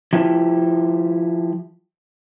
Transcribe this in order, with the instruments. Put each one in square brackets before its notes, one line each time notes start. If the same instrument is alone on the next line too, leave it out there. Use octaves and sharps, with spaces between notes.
[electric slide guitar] F3 E4 G4